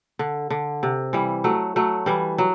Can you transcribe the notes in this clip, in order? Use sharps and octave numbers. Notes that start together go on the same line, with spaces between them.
D3
D3
C3
E3 G3
F#3 A3
F#3 A3
E3 G3
F#3